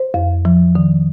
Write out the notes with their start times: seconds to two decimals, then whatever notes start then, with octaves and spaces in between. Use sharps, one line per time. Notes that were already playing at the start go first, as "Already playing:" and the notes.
Already playing: C5
0.14 F2
0.45 F3
0.75 D#3